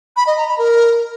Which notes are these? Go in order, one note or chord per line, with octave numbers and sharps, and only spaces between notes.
B5
D#5
A#5
B5
A#4